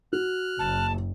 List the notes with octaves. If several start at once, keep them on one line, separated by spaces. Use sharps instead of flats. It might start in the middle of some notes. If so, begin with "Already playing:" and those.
F#4 F6 F#6
F#1 A5